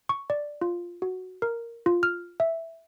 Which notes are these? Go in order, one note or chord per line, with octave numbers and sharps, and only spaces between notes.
C#6
D5
F4
F#4
A#4
F4
F6
E5